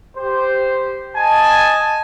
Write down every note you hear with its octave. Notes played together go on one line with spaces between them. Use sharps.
G4 C5
D#5 G#5 A5